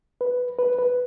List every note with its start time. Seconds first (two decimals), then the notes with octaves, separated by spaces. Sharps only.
0.21 B4
0.59 B4
0.79 B4